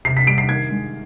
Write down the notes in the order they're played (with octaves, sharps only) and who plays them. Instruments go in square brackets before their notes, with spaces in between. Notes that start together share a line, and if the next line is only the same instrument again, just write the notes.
[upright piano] C3 C7
B6
G3 D7
C7
D#3 G#6
G#3